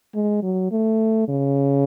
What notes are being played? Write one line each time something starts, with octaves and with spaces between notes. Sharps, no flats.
G#3
F#3
A3
C#3